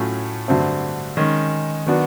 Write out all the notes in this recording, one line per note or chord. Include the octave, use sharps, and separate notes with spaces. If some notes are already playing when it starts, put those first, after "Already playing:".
Already playing: A2 F#3 A3 C#4 F4
G2 D3 F#3 A3 C4
D#3 G#3 C#4
D#3 F#3 B3 D4 F#4